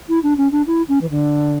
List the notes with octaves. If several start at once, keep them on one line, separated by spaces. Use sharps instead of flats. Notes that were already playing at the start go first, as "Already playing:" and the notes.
E4
D4
C#4
D4
E4
C#4
E3
D3